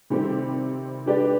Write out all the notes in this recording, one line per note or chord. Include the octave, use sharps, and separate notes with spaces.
C3 D#3 G3 C4 G4
G#3 D4 G4 B4 D5